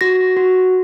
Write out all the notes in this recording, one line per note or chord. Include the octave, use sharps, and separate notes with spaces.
F#4 A#6
F#4